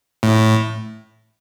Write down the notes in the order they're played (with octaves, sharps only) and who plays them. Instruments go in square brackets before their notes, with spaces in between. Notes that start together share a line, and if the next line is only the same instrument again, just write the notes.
[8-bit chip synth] A2